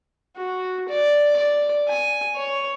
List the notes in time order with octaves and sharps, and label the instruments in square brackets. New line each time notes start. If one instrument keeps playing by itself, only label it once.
[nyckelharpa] F#4
D5
D5
G#5
C#5